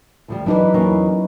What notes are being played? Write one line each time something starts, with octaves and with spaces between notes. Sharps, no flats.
D2 F3 G3
E3 F#3 D4 D#4 B4
E2 A#3 C#4